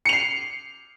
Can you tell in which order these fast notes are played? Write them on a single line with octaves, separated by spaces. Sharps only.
C#7 F7 C7